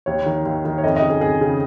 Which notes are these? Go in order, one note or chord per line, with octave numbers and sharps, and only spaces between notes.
D#2 C#5
D#3
D#2
D#3
C#5
F2 D#5
D#5
C#3
G#4
F2 G#4
C#3